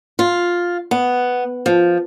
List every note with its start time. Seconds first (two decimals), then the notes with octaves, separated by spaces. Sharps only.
0.19 F4
0.91 B3
1.66 F3